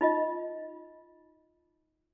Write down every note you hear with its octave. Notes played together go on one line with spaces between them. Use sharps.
D#4 F4 D#5